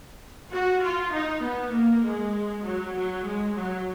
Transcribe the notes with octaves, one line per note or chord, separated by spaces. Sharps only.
F#4
F4
D#4
B3
A#3
G#3
F#3
F#3
G#3
F#3